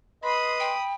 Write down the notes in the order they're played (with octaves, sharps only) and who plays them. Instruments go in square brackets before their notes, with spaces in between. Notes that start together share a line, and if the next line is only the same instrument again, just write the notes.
[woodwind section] B4 D#5 C6 [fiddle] B5 D#6
[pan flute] G5